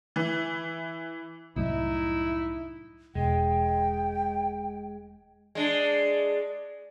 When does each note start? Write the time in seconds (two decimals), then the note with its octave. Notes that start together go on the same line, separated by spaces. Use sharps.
0.16 E3
1.56 C2 F#2 A2 D#4 E4
3.15 E1 G#3 G5
5.55 G#3 D4